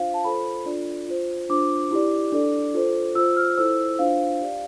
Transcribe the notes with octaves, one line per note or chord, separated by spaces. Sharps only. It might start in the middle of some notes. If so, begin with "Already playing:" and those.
Already playing: D4 F4 C5 F5
A5
F4 A4 C5 B5
D4 F4 A4 D5
F4 C5
D4 F4 C5 D6
E4 G4 D5
D4 A4 D5
F4 A4 C5
F4 C5 E6
F6
E4 A4 C5 E6
D4 F4 C5 F5
G4 D5